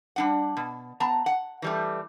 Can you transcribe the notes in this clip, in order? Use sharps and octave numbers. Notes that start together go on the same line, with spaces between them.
G3 D4 F#5
B2
B3 A5 A#5
F#5
E3 G3 A3